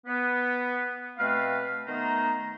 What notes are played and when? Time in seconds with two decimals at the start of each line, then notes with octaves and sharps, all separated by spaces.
0.06 B3
1.17 B2 A3 C4 B4 F5
1.87 D#3 A3 B3 C5 A#5